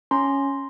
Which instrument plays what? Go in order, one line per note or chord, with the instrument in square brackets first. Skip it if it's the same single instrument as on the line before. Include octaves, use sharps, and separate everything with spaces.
[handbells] C#4 A#5 C6